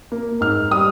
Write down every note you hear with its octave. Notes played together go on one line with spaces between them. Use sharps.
A#3
G#2 F6
G3 D#6